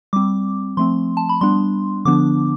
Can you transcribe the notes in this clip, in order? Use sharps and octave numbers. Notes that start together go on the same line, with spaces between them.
G3 C4 D6
F3 A3 C4 C6
A5
B5
G3 B3 D4 C6
D3 F3 B3 D4 D6